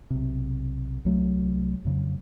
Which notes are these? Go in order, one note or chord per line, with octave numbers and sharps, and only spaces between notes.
B1 C3
C2 F#3 A3
F2 C#3 F#3